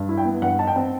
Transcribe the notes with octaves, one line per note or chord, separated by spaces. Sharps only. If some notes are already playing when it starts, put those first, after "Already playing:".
Already playing: G2
E4
G5
B3
G2 F#5
D#4 A5
G5
C4